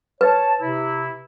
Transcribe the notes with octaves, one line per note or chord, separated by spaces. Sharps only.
B4 C#5 A5
C3 E4